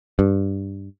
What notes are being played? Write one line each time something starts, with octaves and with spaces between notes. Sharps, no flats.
G2